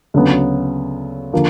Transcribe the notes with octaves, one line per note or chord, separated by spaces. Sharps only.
D2 C#3 F#3 B3
D3 F3 A#3